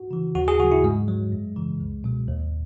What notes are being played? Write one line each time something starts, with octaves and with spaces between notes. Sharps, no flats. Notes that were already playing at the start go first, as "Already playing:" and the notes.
Already playing: F#4
C#3 E3
D#2 F#4
G#4
C#3 F#3 F#4
E4
G#2 G#3
F#3
F#2
C#3 E3
C#2
B2 F#3
D#2